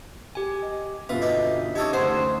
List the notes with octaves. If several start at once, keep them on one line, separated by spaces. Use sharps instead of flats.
G4 G#5
D#5
G1 B2 F4 B4 E5
D#4 G4
F#2 D#4 G4 A4 C#5 A5 D#6
D2 C5 F#5